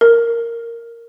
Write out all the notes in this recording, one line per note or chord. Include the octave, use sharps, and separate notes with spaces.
A#4